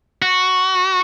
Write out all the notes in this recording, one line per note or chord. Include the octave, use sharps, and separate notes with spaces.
F#4